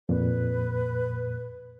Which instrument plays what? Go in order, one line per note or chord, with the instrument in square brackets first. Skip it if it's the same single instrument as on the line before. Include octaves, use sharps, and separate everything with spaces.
[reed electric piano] F2 A#2 [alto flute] B4